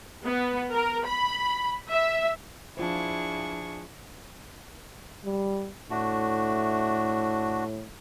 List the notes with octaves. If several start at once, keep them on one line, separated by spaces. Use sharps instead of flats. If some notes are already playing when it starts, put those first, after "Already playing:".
B3
A#4
B5
E5
F3 D4 E4 F4 G#4 C5 C#6
G3
A2 A3 D4 F#4